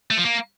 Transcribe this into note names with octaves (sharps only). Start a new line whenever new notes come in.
A3
F3
A#3